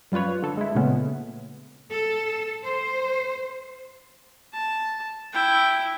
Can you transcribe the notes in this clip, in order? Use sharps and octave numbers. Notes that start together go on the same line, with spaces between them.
F#2 G3 F4 B4 C#5
D3 A4
G#3 E4
A#2 C#3 G#3 A3 B3 C#4
A4
C5
A5
E4 G5